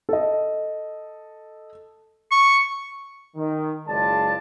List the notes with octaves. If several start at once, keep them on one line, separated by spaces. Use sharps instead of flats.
A4 D#5
C#6
D#3
F#1 C#2 G#3 F4 D5 A5